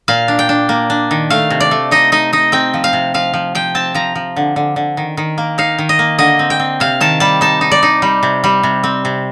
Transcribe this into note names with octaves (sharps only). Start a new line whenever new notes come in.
A#2 F5
D4
G5
D4
A#3
D4
D#3
A3 F5
C3
D5
A3
D#4 D#5
D#4 D#5
D#4 D#5
C4 G5
F3
F5
C3
F3 F5
F3
F3 G5
C4 A5
F3 A#5
F3
D3
D3
D3
D#3
D#3
A#3
D#4 F5
D#3
D#5
A#3
D3 D#5
C4
G5
C4
C3 F5
D#3 A5
G3 A5
D#4 A5
D#4
D5
D#4
G3
C3
G3
C3
C4
C3